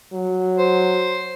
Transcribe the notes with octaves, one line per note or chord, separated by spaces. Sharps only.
F#3
C5